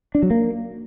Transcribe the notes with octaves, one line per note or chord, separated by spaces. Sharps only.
D4
F#3
A#3